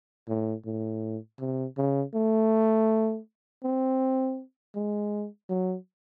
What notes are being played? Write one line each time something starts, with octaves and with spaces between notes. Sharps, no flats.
A2
A2
C3
C#3
A3
C4
G#3
F#3